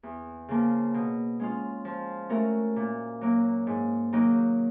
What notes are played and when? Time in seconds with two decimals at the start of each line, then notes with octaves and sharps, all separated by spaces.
0.03 E2
0.48 C#3 F3 A#3
0.94 B2
1.40 G#3 C#4 F4
1.85 F3
2.29 A3 C#4 F#4 A#4
2.76 A#2
3.21 F#3 A#3
3.67 G#2
4.12 D#3 F#3 A#3 D#4